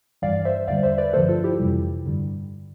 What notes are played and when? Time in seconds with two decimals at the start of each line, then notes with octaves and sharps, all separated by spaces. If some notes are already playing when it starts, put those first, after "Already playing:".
0.22 G2 E3 G3 D5 F5
0.45 C5 E5
0.68 E2 D3 G3 D5 F5
0.83 C5 E5
0.98 B4 D5
1.13 G2 D3 F3 A3 A4 C5
1.29 F4 A4
1.44 E4 G4
1.59 F2 C3 E3 G3
2.05 G2 D3 G3